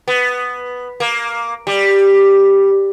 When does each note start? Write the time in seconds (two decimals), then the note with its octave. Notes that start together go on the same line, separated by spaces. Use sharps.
0.08 B3
1.00 A#3
1.67 G3